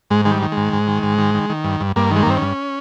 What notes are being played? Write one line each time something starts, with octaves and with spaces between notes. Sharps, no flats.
G#2 G#3
D#3 G#3
G3
D#3
G#3
G#2
G#2
D#3
G#2
D#3
D#3
D#3
G2
G2
G2 A#3
D#3 G#3
A#3
G2 C4
G2 C#4